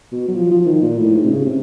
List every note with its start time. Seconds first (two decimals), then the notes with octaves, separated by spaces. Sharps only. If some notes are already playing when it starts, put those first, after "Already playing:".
0.12 B2
0.28 F#3
0.35 F3
0.51 F3
0.67 D#3
0.82 A#2
0.98 A2
1.14 G#2
1.24 C3
1.30 C#3
1.45 C3